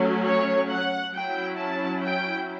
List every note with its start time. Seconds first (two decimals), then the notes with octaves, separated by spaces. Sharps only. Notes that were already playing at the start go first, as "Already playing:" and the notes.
Already playing: F#3 A3 C#4
0.24 C#5
0.69 F#5
1.13 F#3 C#4 E4 G5
1.58 A5
2.02 G5